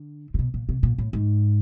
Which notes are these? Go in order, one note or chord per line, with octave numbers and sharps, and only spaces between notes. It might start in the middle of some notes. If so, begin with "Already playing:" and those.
Already playing: D3
C3
B2
A#2
C3
A#2
A2
G#2